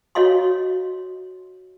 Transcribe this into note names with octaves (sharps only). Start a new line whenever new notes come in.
F#4 C#5 D#5 F5 C6